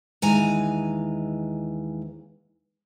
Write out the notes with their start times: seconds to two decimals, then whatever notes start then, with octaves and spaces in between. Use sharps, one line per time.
0.22 D#2 E3 G#3 B4 G#5 A#5